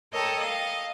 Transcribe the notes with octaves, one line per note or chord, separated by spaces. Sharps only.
A4 A#4 C#5 D#5 G5 A5
D#5 F5